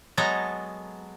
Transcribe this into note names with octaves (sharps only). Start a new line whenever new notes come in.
F#3 G#3 B3 A4 A#5